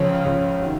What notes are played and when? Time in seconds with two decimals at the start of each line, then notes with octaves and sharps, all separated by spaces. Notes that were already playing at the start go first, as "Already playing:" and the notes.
Already playing: C#2 C#3 F3 C#4
0.24 C#2 C#3 F3
0.61 C3 D#3 F#4